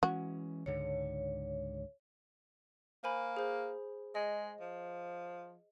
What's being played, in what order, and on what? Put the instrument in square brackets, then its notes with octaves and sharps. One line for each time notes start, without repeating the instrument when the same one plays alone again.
[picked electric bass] E3 G#3 C#4 [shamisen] F#4
[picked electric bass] C#2 G#2 D3 [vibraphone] C#5
[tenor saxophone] A#3 [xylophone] C5 G#5 B5
[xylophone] G#4 C5
[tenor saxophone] G#3 [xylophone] D#5
[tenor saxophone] F3